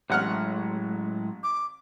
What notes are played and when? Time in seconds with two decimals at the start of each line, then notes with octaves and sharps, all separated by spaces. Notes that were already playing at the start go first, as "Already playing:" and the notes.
0.10 A1 A2 F#3 G#3 F#5 F6
1.43 D6